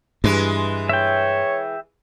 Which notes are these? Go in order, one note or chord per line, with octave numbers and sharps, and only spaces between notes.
G2 E3 G#3 B4
C#5 E5 G5